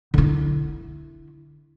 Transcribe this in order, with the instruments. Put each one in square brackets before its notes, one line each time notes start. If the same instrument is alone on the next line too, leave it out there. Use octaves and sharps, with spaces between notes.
[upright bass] D3 E4